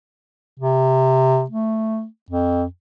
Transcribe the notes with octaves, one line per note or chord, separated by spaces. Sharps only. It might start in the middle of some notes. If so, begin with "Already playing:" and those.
C3
A3
F2